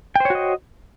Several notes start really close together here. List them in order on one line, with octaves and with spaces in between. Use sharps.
G5 C5 C#5 F#4 D#5